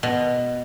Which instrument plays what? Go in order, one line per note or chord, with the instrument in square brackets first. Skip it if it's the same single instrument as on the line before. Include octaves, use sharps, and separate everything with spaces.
[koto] B2